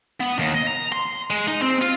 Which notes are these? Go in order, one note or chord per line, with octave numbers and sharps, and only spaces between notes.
B3
D#2
D#5
A#5
C6
G#3
D#4
C4
F4